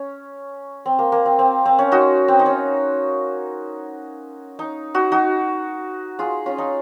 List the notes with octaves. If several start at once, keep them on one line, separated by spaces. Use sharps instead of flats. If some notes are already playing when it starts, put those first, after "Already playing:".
Already playing: C#4
C4
A#3
A#3
C4
C4
C4
C#4
D#4 F#4
C4
D#4
C#4
D#4
D#4 F#4
D#4 F#4
F4 G#4
C#4 F4
D#4